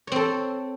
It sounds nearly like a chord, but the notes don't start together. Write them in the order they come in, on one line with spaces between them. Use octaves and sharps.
C#5 C4 A4